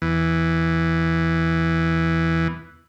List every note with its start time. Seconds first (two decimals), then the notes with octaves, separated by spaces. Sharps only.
0.02 E2 E3